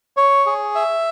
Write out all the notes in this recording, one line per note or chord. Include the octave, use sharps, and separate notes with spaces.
C#5
G#4
E5